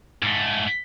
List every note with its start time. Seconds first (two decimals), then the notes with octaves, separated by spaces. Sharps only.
0.23 G#2 A3